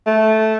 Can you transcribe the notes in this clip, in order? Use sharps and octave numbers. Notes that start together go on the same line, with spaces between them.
A3